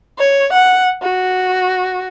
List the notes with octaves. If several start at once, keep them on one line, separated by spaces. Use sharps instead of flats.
C#5
F#5
F#4